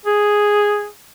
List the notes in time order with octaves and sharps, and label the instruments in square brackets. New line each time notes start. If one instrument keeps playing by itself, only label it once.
[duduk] G#4